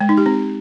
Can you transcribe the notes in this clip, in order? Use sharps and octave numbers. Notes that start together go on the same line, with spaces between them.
G#3
D#4
G4
C4